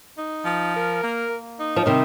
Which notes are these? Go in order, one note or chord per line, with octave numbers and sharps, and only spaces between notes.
D#4
F3
A#4
A#3
A#3
D#4
F3
C3 D#3 G3